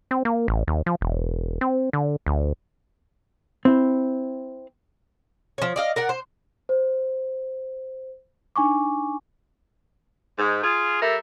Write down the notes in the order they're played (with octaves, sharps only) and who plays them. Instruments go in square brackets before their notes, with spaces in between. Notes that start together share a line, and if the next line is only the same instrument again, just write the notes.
[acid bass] C4
A#3
A1
D#2
F3
E1
C4
D3
D2
[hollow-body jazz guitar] C4 E4
[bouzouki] F3 C#5
D5 D#5 F5
A#4 D5 F#5
C5
[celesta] C5
D4 D#4 G#5 C#6 D6
[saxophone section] G#2
F4 G#4
G3 A4 A#4 E5